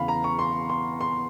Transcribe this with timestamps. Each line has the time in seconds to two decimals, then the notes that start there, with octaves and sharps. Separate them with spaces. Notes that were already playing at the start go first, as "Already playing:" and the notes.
Already playing: E2 C#3 E3 F5 B5
0.08 A#5
0.24 C#6
0.39 C6
0.70 C6
1.01 C6